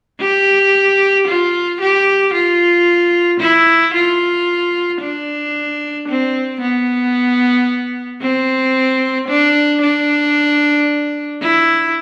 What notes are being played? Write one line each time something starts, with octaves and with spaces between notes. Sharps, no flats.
G4
F4
G4
F4
E4
F4
D4
C4
B3
C4
D4
D4
E4